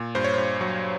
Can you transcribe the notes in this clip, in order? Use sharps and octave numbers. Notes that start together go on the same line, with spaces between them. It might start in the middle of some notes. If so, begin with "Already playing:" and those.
Already playing: A#2
G2 C5
C#5
G2 C5
F#3